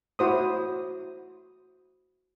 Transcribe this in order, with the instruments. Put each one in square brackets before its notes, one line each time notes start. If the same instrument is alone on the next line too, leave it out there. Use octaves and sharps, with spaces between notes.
[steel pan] E4 F#4 C5 D#6